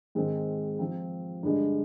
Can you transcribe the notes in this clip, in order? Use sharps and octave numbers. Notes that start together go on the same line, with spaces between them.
G#2 D#3 G#3 C4
F3 C4 F4
G2 D3 G#3